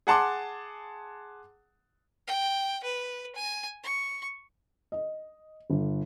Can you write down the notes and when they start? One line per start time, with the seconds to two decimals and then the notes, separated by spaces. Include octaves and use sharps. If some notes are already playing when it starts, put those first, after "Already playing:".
0.07 G#4 F#5 A5 C6 D6
2.27 G5
2.84 B4
3.35 G#5
3.83 C#6
4.92 D#5
5.70 G1